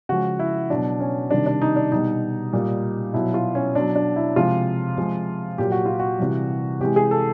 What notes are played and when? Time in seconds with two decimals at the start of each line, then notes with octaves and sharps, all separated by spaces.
0.09 C#3 F3 G#3 F#4
0.39 E4
0.70 B2 F#3 D4
1.00 C#4
1.30 C3 D#3 G3 D4
1.46 D4
1.62 D#4
1.76 D4
1.92 B2 G3 D#4
2.53 A#2 G3
3.14 B2 F#3 E4
3.34 F4
3.55 C#4
3.75 B2 F#3 D4
3.95 D4
4.16 E4
4.36 C3 F3 G#3 F4
4.98 C3 F3 G#3
5.58 A#2 F#3 G4
5.72 F#4
5.86 F4
5.99 F#4
6.19 C3 E3 G3
6.81 C3 E3 G#3 G4
6.96 G#4
7.11 A4